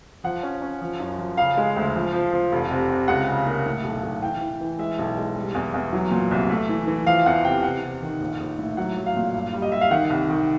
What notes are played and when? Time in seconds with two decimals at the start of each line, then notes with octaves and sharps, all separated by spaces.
0.24 F3 F#5
0.43 C#4
0.62 C#4
0.81 F3
1.00 F#2
1.18 F3
1.37 C#3 F5
1.57 G#3
1.76 D2
1.95 F3
2.13 F3
2.33 F3
2.52 F1
2.70 C3
2.89 C3
3.08 C#2 F#5
3.28 C#3
3.46 A#3
3.66 A2
3.84 B1
4.03 B1
4.23 E3 G5
4.41 E3
4.61 E3
4.79 G#3 E5
4.99 B1
5.17 G#3
5.36 G3
5.55 E2
5.74 E2
5.93 F#3
6.11 A#2
6.31 C2
6.49 A3
6.69 E3
6.87 E3
7.07 F3 F5
7.26 E2 F#5
7.44 C3 G5
7.63 C3 F#5
7.82 C3
8.02 D#3
8.21 A#1
8.40 A#1
8.59 A2
8.77 F#3 F#5
8.97 F#3
9.06 F5
9.16 A#2
9.34 G2
9.53 G3
9.62 D#5
9.72 G3 E5
9.81 F5
9.91 D#3 F#5
10.10 C2
10.28 D#3